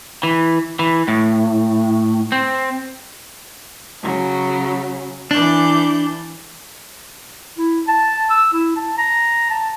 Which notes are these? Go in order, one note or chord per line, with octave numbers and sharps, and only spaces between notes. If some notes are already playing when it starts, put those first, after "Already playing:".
E3
E3
A2
C4
C#3 F#3
E3 D4 D6 G6
E4
A5
E6
E4
A5
A#5
A5